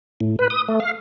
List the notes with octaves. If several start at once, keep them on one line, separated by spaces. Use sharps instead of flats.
A2
B4
D#6
A3
F5